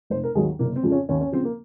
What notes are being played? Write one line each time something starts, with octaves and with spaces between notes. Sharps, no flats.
F1 C5
A#4
D#2 D#3 F#3 G#4
F#1 A#3
C4
F2 C#3 F3
C#4
D#2 C#4
C#4
C#3 F3 C4
A#3